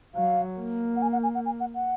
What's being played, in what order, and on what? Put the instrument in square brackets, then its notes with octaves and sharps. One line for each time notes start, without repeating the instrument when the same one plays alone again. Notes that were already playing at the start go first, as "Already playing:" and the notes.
[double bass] F#3 [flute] F5
[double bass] A#3
[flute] F#5
G#5
F#5
G#5
F#5
G#5
F#5
F#5